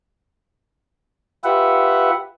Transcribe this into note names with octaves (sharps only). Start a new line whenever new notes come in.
F4 G4 B4 E5 F#5